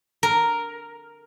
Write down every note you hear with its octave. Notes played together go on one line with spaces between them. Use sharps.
A#4